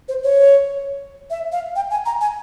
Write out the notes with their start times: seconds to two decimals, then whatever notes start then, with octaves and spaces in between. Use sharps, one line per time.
0.09 C5
0.23 C#5
1.30 E5
1.52 F5
1.76 G5
1.90 G#5
2.06 A#5
2.21 G#5